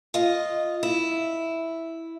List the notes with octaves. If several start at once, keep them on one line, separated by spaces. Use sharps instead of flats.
F4 D#5
E4